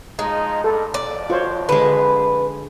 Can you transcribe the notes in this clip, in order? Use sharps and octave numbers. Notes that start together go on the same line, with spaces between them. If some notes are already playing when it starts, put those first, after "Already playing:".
F3 G#3 D#4
G2 A4
G#1 F2 D5
F4 F#4 C5 C#5
D3 G#3 B4